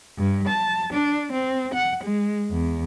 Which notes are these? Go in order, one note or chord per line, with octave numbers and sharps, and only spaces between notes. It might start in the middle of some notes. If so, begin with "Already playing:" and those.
G2
A5
D4
C4
F#5
G#3
E2